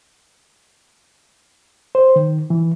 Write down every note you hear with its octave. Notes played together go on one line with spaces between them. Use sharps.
C5
D#3
E3